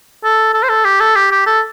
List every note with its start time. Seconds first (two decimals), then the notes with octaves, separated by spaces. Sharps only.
0.25 A4
0.54 A4
0.63 C5
0.69 A4
0.85 G4
1.01 A4
1.16 G4
1.31 G4
1.47 A4